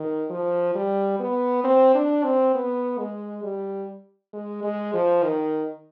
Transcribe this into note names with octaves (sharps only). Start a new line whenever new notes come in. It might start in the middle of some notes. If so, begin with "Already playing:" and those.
Already playing: D#3
F3
G3
B3
C4
D4
C4
B3
G#3
G3
G#3
G#3
F3
D#3